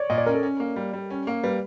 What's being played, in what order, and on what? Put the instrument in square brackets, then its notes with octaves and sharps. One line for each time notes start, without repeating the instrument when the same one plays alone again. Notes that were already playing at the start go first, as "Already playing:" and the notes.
Already playing: [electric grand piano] C#5 D5
[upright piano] A#2 [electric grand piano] D#5
[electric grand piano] D5
[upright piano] C#4 [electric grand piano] A#4
[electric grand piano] A4
[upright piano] C#4
A#3
G3
G3
C#4
A#3
[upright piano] G3 [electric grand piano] B4